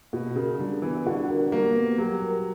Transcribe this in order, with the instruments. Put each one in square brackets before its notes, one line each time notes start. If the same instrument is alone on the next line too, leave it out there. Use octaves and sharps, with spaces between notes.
[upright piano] B2 [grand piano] F#4
[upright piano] C#3 [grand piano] A#4
[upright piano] D3 [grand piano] G3
[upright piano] E3 [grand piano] B3
[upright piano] D3 [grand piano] F#4
[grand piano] A#4
[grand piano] G3 [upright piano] A#3
[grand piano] B3
[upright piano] F#3 [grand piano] G4
[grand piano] A#4